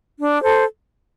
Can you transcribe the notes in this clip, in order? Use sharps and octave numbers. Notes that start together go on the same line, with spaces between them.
D4
A4 C5